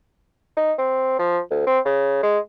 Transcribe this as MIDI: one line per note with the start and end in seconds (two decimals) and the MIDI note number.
0.57 0.73 63
0.78 1.18 60
1.19 1.40 53
1.50 1.66 38
1.67 1.79 60
1.85 2.20 49
2.23 2.39 56